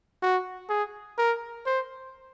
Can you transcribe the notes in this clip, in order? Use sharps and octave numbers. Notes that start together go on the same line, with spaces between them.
F#4
G#4
A#4
C5